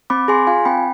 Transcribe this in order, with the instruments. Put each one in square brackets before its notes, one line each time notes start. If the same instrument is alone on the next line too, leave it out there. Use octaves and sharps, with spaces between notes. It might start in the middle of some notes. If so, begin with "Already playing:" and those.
[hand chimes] C4 B5 D6
G#4 G#5 C6
F4 F5 G#5
C4 G5 B5